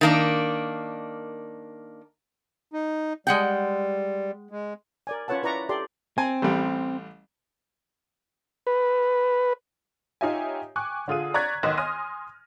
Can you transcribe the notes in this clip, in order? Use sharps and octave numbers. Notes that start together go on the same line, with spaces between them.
D#3 A#3 D4
D#4
G3 G#3 F#5 G5
G#3
A#4 D5 G#5
C#4 F4 B4 C#5 F#5 A5
E4 B4 D5 A#5 C#6
G4 A4 D5 C6
C4 G#5
A1 G3
B4
D#4 F4 G4 C#5 E5 G#5
G5 G#5 C#6 D6 F#6
D3 F4 G#4 D#7
D5 A#5 C#6 F#6 G#6 B6
B1 D#3 B3 D#5 C6
G#5 C6 D#6 F6 A#6 D#7